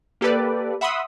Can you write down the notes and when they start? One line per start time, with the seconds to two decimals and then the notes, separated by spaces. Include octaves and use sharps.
0.21 A#3 G4 A4 B4 D5
0.81 E5 F#5 B5 C6 D#6 E6